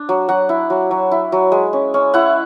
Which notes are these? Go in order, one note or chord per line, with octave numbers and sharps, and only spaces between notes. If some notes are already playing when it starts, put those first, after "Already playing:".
Already playing: D4
F#3
F#3 F#5
E4
F#3
F#3
E4
F#3
G#3
C#4
C#4
E4 F#5